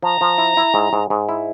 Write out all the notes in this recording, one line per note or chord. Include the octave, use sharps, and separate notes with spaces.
F3 A#5
F3
E4
E4
G#2
G#2
G#2
E4